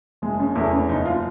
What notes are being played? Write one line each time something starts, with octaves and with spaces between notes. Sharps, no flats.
F#1 G#3
C#3
E2 A3
C#3
F#1 D#4
F4